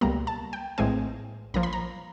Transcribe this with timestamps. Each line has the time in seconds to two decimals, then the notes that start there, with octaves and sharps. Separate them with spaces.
0.01 C#2 B2 G3 A#3 A#5
0.27 A5
0.53 G5
0.78 A#1 A2 E3 G#3 C4 G#5
1.54 A#1 A#2 F3 A#5
1.63 B5
1.73 A#5